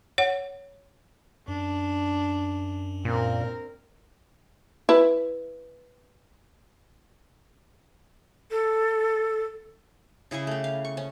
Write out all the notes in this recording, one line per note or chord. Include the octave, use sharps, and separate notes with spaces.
C#5 F#5
F#2 D4
A#2 C4 A#4
E4 B4
A4
C#3 E4 G#4 C#6
A3 G4
F5
C#6
C#4